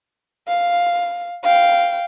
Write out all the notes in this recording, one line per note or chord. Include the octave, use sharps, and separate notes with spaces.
F5
F5 G5